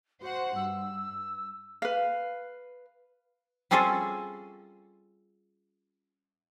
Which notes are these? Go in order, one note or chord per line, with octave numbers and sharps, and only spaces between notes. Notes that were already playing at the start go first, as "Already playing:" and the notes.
F#4 C5 F#5
G2 E6
B4 F5
G3 C4 C#4 F4 G#4 A4